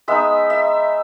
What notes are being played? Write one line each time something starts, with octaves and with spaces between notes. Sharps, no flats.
G#3 B3 D#4 E5
E5